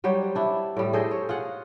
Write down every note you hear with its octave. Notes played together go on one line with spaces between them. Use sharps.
F#3 G3 C5 C#5
D4 E4
A2 G3
G#4 A4 C5 D#5
C#5
F4 G#4 F#5